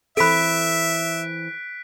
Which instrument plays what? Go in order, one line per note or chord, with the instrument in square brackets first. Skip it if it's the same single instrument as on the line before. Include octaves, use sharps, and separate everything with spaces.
[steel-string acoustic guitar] E3 C4 [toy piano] A4 B5 [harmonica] E5 [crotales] F#6 B6 D7